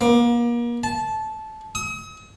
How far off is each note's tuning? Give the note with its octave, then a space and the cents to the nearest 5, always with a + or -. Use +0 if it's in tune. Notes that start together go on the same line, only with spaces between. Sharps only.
A#3 +35
A5 -15
D#6 +45